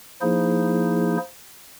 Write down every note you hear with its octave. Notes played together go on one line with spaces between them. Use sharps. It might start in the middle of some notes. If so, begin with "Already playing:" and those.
F3 A#3 D#4 E4 G#4 C5